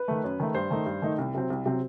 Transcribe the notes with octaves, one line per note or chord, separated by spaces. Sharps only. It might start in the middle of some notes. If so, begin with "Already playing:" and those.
Already playing: B4
D#3 A3
F#2
D#3 A3
G2 C5
D#3 A3 D#4
G2
D#3 A3 D#4
C2
C3 F#3 C4
C2
C3 F#3 C4